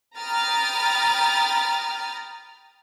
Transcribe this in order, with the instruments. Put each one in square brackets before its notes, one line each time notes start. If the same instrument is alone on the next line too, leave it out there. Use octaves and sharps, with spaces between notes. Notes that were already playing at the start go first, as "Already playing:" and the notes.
[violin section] G5 A#5 B5 D#6 F6 A6